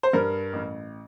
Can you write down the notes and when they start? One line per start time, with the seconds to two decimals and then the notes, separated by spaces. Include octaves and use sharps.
0.03 C5
0.13 G2 A#4
0.53 A1